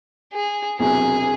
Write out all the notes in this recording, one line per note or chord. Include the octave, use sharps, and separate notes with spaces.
G#4
E1 E2 C3 F#3 G#4